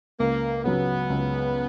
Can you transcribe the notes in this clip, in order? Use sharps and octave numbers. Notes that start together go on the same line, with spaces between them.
C#2 A#3
C#3 F#3 B3
C#2